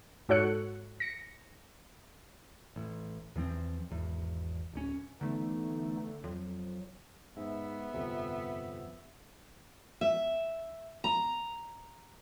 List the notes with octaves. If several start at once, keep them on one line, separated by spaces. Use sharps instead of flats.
G#2 F#4 A4 C#5 F#6 C#7
A#6 C#7
A1
E2 E3 F3 C4
G#1 E2
D1 C#4
D3 E3 A3 B3 D#4
F2 F#3
G#2 B3 E5
G1 F2 C3
E5
A#5